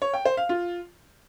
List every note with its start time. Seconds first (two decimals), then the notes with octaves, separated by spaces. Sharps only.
0.02 C#5
0.14 G5
0.25 C5
0.37 F5
0.49 F4